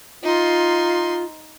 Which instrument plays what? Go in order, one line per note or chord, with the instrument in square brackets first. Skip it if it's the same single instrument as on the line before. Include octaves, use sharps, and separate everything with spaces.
[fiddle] D#4 C6 [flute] F4